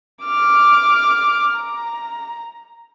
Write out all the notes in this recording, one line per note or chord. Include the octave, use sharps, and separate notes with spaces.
D6 F6
A#5